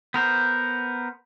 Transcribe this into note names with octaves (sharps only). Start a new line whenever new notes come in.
B3 A#4 C5